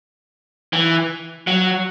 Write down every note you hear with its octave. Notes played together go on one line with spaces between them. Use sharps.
E3
F#3